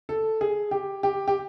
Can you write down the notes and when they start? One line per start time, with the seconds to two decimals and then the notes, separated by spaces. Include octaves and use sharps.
0.09 A4
0.41 G#4
0.71 G4
1.03 G4
1.28 G4